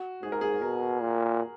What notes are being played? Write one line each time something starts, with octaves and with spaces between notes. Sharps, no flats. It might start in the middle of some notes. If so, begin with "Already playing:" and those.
Already playing: F#4
G#2 G#4
A#4
G#4
B2 A#4
A#2